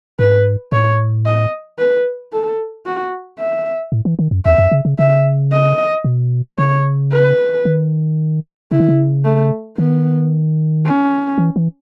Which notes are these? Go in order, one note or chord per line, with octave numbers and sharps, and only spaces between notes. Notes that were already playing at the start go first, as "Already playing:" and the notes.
G#2 B4
A2 C#5
D#5
B4
A4
F#4
E5
A2
E3
D#3
F#2
E2 E5
F#2
C#3
C#3
C#3 E5
D#5
B2
C#3 C#5
B4
D#3
C#3 E4
D#3
C#3
A3
D#3 B3
C#4
E3
E3